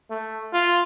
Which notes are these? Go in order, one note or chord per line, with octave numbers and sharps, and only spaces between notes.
A3
F4